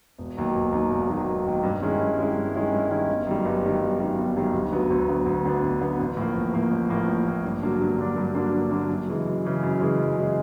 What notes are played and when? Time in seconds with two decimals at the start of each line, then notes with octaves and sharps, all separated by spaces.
0.18 E1
0.37 D#2 D#3 F#3
0.55 E1
0.72 D#2 D#3 F#3
0.90 E1
1.09 D#2 D#3 F#3
1.27 E1
1.46 D#2 D#3 F#3
1.63 G2
1.82 D#3 G#3 C#4 E4
2.00 G2
2.18 D#3 G#3 C#4 E4
2.36 G2
2.55 D#3 G#3 C#4 E4
2.72 G2
2.90 D#3 G#3 C#4 E4
3.08 G1
3.27 F#2 D#3 G3
3.45 G1
3.63 F#2 D#3 G3
3.81 G1
3.99 F#2 D#3 G3
4.18 G1
4.36 F#2 D#3 G3
4.53 D2
4.72 D3 F#3 B3
4.90 D2
5.08 D3 F#3 B3
5.26 D2
5.45 D3 F#3 B3
5.63 D2
5.81 D3 F#3 B3
5.99 A1
6.17 A2 F3 A#3
6.35 A1
6.54 A2 F3 A#3
6.71 A1
6.89 A2 F3 A#3
7.07 A1
7.26 A2 F3 A#3
7.44 G2
7.62 D3 F#3 A#3 D4
7.80 G2
7.98 D3 F#3 A#3 D4
8.17 G2
8.34 D3 F#3 A#3 D4
8.53 G2
8.71 D3 F#3 A#3 D4
8.89 F#2
9.08 C#3 E3 G#3
9.26 F#2
9.44 C#3 E3 G#3
9.63 F#2
9.80 C#3 E3 G#3
9.98 F#2
10.16 C#3 E3 G#3